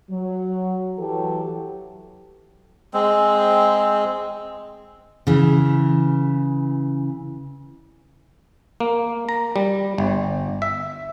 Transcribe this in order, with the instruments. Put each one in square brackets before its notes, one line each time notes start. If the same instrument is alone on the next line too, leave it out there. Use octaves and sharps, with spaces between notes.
[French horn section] F#3
E3 F#3 G4 A4
[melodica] G#3 C4
[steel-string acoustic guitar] C#3 E3
[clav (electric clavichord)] A#3
A#5
G3
G1
E5